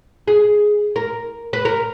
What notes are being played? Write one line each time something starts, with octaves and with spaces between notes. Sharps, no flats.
G#4
A#4
B4
A#4